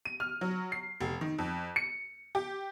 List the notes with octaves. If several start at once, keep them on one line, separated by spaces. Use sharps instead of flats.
D#7
F6
F#3
C7
F1
D#3
F2
C#7
G4